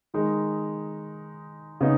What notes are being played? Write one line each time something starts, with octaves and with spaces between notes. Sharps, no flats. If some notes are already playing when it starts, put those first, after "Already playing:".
D#3 G#3 D#4
C#3 B3 D#4